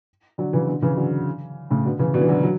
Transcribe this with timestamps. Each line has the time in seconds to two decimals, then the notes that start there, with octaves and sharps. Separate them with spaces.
0.38 D3 F#3
0.53 C#3 E3
0.67 B2 D3
0.82 C#3 E3
0.97 D3 F#3
1.71 A2 C#3
1.85 B2 D3
1.99 C#3 E3
2.14 B2 D3
2.21 E3
2.29 D3 F#3
2.43 F#3